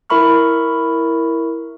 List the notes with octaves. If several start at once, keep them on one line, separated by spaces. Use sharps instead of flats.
E4 A#4 E5 B5 C#6 F6